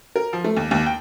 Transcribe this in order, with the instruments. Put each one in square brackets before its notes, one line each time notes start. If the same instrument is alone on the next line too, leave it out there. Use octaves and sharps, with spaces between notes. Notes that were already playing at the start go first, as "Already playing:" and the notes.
[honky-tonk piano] A#4
F3
A3
D#2
D#2
G5